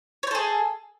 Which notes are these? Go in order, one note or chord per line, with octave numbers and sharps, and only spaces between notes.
G#4 A4 C5 C#5